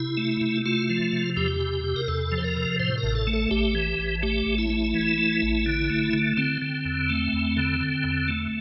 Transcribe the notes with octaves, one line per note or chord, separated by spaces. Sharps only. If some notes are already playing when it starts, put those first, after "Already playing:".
Already playing: C3 E4
A3
C3
A3 F4
F3
C3
E2 G4
C3
C3
A#4
E2 A4
F3
C5
A#4
C3
A2 C5
A#4
A1
A4
A3
A4
A1 G4
E3
A1
A3 G4
A1
E4
A3
E3
A3
A1
D3
A3
D3
D3 C4
D3
E2
A3
E2
D3
D3
E2
A3